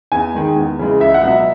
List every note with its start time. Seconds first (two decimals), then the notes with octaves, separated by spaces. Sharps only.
0.12 E2 G#5
0.34 D#3 G#3
0.56 E2
0.79 C#3 E3 G#3
1.00 C#2 E5
1.14 F#5
1.23 B2 F#3 E5